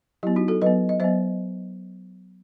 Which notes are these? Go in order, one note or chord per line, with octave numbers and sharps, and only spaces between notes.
F#3 B3 E4 G4
D#4 F#4
F#4 A4
F#3 B3 B4 D#5
D#5
F#3 B3 C5 E5